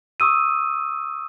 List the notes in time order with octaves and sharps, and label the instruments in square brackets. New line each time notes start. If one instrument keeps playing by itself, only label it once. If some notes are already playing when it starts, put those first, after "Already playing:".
[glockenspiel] C#6 D#6 E6 D#7